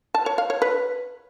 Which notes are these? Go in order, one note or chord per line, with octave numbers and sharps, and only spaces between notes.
A5
C#5
F5
C#5
B4